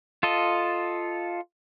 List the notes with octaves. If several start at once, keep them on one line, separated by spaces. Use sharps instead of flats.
F4 A4 D#5